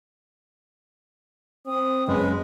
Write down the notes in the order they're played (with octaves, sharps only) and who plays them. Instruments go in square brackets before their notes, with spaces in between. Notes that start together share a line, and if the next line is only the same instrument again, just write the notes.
[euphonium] C4 [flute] D#6
[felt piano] F#1 [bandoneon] G#3 [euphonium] C#4 [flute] B4